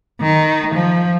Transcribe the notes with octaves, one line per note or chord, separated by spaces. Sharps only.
D#3
F3